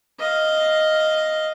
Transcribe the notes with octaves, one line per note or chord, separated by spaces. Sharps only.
D#5 F5